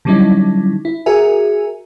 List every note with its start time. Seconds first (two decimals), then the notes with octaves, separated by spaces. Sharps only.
0.05 D3 F#3 G3 C#4 D#4 E4
0.85 E4
1.06 F#4 G#4 A#4 E5 G#5